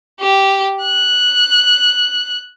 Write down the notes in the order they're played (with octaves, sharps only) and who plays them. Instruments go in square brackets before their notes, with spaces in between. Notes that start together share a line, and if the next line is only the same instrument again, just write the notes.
[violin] G4
F#6